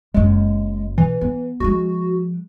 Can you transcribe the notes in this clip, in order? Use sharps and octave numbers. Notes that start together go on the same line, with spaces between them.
F#1 F#2 G#3
B2 E3
B3
F3 G#3 F#4